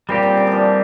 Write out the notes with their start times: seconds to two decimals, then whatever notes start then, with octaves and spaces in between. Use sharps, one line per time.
0.09 A#2 G3 C4 G4
0.23 A#2
0.37 D3
0.47 E3 F3